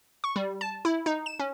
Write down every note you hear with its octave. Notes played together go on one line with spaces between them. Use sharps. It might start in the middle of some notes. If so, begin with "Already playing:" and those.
C#6
G3
A5
E4
D#4
E7
C#4